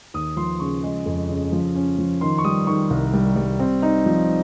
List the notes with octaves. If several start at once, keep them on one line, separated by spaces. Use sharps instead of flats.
D#2 D#6
F3 C6
C#3 C#6
G#3
F2
C#3
F3
C#4
F3
D#3 C6
C#6
G3 D#6
D#3 C#6
C2
G3
G3
C4
D#4
F3